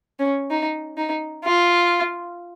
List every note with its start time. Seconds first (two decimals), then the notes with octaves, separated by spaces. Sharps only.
0.19 C#4
0.51 D#4
0.97 D#4
1.44 F4